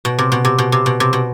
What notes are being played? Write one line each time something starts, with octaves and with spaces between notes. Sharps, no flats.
B2
C3
B2
C3
B2
C3
B2
C3
B2